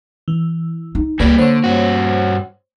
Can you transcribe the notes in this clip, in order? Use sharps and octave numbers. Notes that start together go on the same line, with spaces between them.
E3
D#4
C#2 G3 A#3 G#4 B4 D5 A#6
D3 C5 C#5
G2 F#4